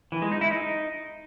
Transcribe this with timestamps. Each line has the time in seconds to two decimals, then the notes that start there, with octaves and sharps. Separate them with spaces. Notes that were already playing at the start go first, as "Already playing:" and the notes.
0.12 E3
0.22 G#3
0.31 D#4
0.41 E4
0.51 D#4